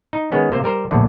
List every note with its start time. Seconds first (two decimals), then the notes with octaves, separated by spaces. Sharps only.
0.13 D#4
0.32 D#3 G#3 B3 C#4
0.52 C3 A#3 C5
0.64 G3 A#4 C5
0.91 A#1 E2 A2 D3